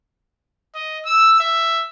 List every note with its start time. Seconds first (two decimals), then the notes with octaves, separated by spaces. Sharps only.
0.75 D#5
1.06 E6
1.40 E5